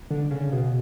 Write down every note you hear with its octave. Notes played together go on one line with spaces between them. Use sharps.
D3
C#3
B2